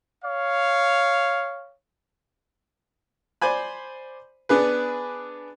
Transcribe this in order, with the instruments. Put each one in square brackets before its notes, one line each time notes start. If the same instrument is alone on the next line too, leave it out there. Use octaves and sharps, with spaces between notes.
[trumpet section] C#5 F5
[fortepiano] C5 D5 G#5 B5
B3 D4 G#4 B4